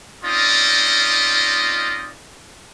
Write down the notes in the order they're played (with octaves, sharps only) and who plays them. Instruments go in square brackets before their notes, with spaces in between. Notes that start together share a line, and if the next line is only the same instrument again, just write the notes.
[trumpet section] C4 C#4 D#4 F4 D5 D#5